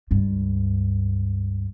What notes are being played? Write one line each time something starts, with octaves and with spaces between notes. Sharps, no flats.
C#2 G2